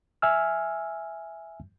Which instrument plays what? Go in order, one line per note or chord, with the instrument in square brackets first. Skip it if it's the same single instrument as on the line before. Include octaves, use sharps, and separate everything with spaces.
[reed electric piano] E5 G#5 E6 F6